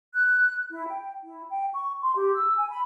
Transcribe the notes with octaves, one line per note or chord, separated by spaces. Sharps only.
F#6
E4
G5
E4
G5
C#6
C6
G4
E6
G#5
B5